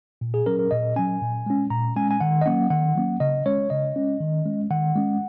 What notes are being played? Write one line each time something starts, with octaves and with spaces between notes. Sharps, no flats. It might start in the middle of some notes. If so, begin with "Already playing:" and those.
A#2
G#4
F#3 C#4 A#4
A#4
A#2 D#5
F#3 C#4 G#5
A#2
G#3 C#4
A#2 A#5
G#3 C#4 G#5
G#5
D#3 F#5
D#5
F#3 A#3 C#4 F#5
D#3 F#5
F#3 A#3 C#4
C#3 D#5
G#3 C#4 C#5
C#3 D#5
G#3 C#4
D#3
G#3 C#4
D#3 F#5
G#3 C#4